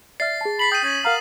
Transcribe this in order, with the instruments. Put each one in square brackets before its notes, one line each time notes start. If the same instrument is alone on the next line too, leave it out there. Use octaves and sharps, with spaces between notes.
[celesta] D5 E5 F6 [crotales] A6 C7
[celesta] G#4 A5
[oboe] B5 [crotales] B6 C7 F#7
[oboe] G5 [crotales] D#6 D#7
[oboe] C#4 [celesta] G6
[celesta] A#4 F#5 A#5 [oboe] F5